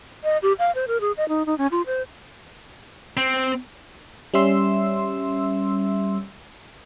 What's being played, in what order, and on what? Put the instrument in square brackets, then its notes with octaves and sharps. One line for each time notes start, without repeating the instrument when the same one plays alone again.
[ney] D#5
G4
F5
C5
A#4
G#4
D#5
D#4
D#4
C#4
F4
C5
[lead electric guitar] C4
[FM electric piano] G3 C#4 E5 C6 E6